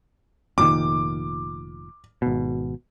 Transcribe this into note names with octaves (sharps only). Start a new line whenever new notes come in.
F1 A#2 D#3 D6
G#1 B2